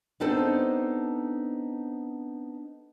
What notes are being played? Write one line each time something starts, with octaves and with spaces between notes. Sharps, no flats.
B3 C4 D4 D#4 A4 C5